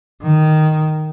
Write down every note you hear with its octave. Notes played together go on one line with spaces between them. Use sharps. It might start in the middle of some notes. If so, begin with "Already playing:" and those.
D#3